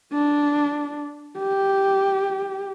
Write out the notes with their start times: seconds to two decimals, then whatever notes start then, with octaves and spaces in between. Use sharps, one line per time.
0.13 D4
1.39 G4